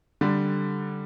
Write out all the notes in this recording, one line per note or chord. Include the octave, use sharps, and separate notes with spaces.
D3 G3